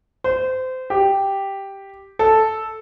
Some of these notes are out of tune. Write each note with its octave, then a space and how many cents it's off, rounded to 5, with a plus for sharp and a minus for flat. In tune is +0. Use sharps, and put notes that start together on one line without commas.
C5 -25
G4 +0
A4 -5